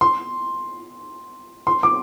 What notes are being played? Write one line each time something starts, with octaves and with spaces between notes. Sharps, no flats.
C6
C6
D6